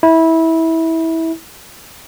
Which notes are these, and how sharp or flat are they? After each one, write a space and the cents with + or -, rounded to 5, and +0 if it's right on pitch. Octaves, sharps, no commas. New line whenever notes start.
E4 -20